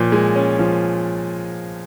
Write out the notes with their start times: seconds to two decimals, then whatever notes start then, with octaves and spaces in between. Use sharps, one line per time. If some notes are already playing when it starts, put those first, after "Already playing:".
Already playing: A#2 F3 C#4
0.12 G#3
0.35 C#4
0.59 F3